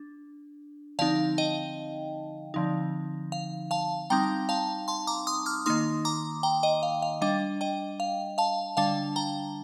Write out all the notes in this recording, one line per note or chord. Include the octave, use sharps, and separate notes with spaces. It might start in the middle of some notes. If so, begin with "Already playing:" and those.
Already playing: D4
D3 F3 C4 D#4 F5 A5
D#5 G5
D3 F3 C4 D#4
F5
F5 A5
G3 C4 D#4 G5 A#5
F5 A5
A5 C6
A#5 D6
C6 D#6
D6 F6
D#3 A#3 D#4 C6 D#6
A#5 D6
G5 A#5
D#5 G5
F5
F5
G3 D4 D#5 G5
D#5 G5
F5
F5 A5
D3 G3 D4 F5 A5
G5 A#5